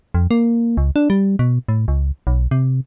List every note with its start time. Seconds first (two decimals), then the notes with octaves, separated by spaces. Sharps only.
0.14 F2
0.31 A#3
0.77 C#2
0.96 D4
1.10 G3
1.39 B2
1.68 A2
1.88 C#2
2.27 B1
2.51 C3